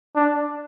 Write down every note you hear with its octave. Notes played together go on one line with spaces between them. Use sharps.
D4